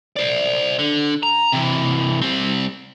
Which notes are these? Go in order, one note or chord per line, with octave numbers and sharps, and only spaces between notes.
C5 D5
D3
A#5
C3 E3
G3 C4